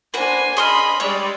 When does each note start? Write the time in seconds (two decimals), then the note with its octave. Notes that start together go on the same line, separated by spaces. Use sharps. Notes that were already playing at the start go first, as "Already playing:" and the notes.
0.14 A#3 D4 F#4 B4 C5 G#5
0.57 G#4 D#5 B5 C6 F6
1.00 G3 G#3 C#5 D5 E6